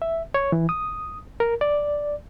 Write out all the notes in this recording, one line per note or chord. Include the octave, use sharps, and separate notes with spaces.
E5
C#5
E3
D#6
A#4
D5